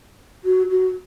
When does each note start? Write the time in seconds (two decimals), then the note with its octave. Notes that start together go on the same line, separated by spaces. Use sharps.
0.45 F#4
0.70 F#4